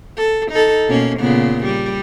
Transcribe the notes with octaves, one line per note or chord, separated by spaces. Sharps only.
A4
D#4 A4
B2 A#3 C#4
A#2 C#3 B3
G3